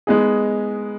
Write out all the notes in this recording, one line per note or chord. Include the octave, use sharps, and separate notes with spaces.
G#3 B3 D#4 G#4